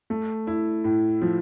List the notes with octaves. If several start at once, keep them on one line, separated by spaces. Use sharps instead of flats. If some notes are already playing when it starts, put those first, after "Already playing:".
A3
E4
A2
F3